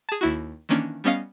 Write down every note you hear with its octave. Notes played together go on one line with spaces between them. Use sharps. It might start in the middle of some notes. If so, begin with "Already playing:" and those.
G#4 A5
D#2 E4 F#4
D#3 E3 A#3 C#4 D4
G3 B3 C#4 D#5 F5